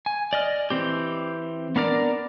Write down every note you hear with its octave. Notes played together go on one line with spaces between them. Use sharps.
G#5
D5 D#5 F6
E3 C4 G4
B3 D4 A#4 D5